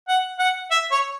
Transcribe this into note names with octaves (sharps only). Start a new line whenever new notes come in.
F#5
F#5
E5
C#5